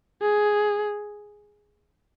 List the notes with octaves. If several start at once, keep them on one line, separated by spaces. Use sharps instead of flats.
G#4